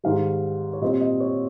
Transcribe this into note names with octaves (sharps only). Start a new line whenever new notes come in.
G#2 D#3 G3 F5
C#5
A#2 G3 C4 D#5
D#5
C#5